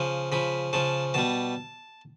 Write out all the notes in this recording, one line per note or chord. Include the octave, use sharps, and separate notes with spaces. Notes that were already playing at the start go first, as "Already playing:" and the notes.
Already playing: C#3 F3
C#3 F3 B5
C#3 F3 A5
B2 G3 A5